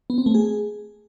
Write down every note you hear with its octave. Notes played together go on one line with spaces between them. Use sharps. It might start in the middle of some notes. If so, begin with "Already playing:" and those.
B3
C4
A3
G#4